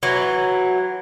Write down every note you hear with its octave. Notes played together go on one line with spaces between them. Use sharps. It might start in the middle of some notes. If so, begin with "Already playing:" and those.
E3 F#3